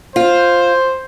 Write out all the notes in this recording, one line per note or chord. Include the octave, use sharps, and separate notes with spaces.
F4 C5